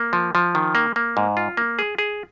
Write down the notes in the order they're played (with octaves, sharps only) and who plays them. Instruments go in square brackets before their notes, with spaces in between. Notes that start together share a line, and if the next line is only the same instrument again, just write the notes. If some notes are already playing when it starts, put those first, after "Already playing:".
Already playing: [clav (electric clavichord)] A#3
F3
F3
D#3
A#3
A#3
G#2
F4
A#3
G#4
G#4